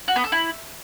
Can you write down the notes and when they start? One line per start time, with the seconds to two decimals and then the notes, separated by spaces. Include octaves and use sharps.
0.08 F#4
0.16 B3
0.24 A4
0.32 E4